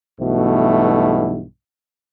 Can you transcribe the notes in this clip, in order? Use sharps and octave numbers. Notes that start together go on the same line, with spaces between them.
B1 G2 B2 E3 A3